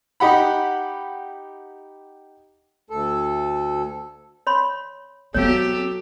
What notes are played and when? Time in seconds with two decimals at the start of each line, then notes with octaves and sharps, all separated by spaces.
0.20 D#4 G4 F#5 B5
2.90 D2 A4
4.47 C#5 B5 C6
5.34 F#3 B3 C4 G4 A4 C#5 F5